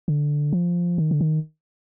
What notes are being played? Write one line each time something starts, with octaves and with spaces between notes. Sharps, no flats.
D3
F3
D#3
D3
D#3